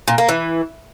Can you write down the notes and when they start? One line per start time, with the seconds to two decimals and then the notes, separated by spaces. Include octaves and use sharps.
0.08 A#2
0.18 A#3
0.29 E3